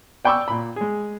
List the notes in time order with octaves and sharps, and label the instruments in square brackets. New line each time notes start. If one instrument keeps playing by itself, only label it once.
[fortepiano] D5 G5 B5 C#6 D6 E6
A#2 B5
G#3 G#4